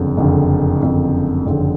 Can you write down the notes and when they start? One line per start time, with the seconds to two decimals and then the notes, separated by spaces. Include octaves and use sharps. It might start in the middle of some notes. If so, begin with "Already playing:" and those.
Already playing: F#1 F2 D3
0.17 F#1 F2 D3
0.81 F#1 F2 D3
1.46 F#1 F2 D3